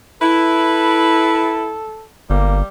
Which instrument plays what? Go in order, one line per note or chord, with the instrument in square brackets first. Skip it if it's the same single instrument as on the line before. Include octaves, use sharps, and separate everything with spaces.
[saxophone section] E4 [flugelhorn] A4 [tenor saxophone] B4
[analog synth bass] G1 [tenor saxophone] G3 [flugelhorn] A#3